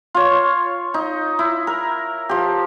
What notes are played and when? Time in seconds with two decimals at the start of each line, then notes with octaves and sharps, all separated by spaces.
0.14 F4 C#5
0.94 D#4
1.39 E4
1.67 A#4
2.29 F3 G4